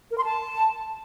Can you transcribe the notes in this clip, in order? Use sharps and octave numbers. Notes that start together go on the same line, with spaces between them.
A#4
C6
A5